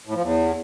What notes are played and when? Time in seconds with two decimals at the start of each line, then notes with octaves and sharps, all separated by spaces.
0.07 A2
0.15 F3
0.22 E2